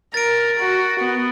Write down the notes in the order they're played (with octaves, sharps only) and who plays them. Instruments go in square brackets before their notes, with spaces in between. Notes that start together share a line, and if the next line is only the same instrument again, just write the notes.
[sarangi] A#4 [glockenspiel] A6 D7
[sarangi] F#4
B3